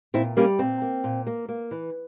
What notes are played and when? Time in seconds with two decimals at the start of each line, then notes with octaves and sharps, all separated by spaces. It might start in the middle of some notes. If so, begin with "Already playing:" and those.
0.14 A#2 C4 E4
0.37 G3 A#3 C#4
0.59 A#2 C4
0.82 A#3
1.04 A#2
1.27 A#3
1.49 A#3
1.71 E3